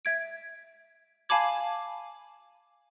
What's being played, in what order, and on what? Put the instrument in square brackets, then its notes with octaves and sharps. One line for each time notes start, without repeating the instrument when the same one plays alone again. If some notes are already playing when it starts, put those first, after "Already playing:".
[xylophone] E5 G#6 D7
F5 G#5 A5 B5 D6 G#6